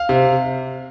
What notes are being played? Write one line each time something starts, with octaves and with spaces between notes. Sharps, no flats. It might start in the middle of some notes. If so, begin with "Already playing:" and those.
Already playing: F5
C3